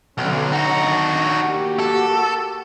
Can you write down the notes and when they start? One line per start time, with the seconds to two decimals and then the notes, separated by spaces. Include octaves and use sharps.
0.18 B1 D3 F#3 C#4
0.52 D#4 F#4
0.83 D#3 D4
1.43 A#3 F#4 G4
1.80 A4